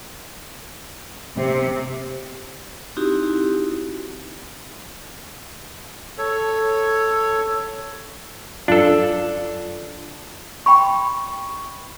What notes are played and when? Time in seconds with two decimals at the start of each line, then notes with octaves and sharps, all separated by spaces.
1.37 C3
2.97 C4 D#4 E4 F#4 G4
6.18 A4 C#5
8.68 F#2 D4 F4 A4
10.66 G5 B5 C#6